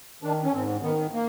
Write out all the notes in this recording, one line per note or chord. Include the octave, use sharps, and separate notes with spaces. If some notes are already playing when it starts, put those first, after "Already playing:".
D#3 D4
C#4
G#2 C4
D#3 B3
A#3